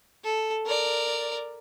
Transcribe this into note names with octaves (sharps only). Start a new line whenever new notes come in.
A4
A#4 D5